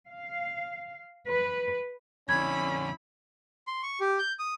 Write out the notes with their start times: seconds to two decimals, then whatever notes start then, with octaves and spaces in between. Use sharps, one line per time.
0.10 F5
1.29 B4
2.29 F2 D3 C#4 E4 B5 G#6
3.67 C6
3.83 C#6
4.00 G4
4.19 G6
4.39 D#6